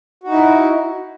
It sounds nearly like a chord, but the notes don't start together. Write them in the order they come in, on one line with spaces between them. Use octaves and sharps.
F#4 D#4 E4